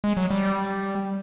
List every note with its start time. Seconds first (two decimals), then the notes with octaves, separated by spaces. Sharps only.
0.04 G#3
0.17 F#3
0.30 G3